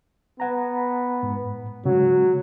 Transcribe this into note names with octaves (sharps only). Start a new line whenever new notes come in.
B3 F#5 A#5
G#2
C#3 F#3 G#3